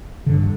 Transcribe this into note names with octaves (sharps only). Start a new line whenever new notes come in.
G2 D3